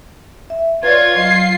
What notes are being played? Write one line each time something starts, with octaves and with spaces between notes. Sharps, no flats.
E5
F4 B4 C#5 D5 G#6
F#3 F4 D#5 C7